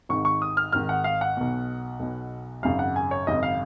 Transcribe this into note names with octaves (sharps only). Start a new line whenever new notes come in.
G#1 G#2 D#3 C#6
C#6
D#6
F6
G#1 G#2 D#3 F6
F#5
F5
F#5
B1 B2
B1 B2
G#1 F#2 C#3 F5
F#5
G#5
C#5
G#1 F#2 C#3 D#5
F5